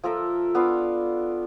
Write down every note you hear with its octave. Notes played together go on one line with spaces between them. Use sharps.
F3 A4 A#4 E5
B3 D4 F4 F5